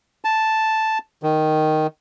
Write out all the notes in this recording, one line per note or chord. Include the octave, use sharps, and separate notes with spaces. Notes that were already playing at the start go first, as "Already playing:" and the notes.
A5
D#3